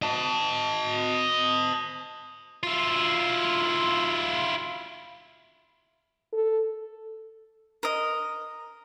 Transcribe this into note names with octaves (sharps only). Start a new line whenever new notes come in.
D#5 A5
E4 F4
A4
A#4 D#5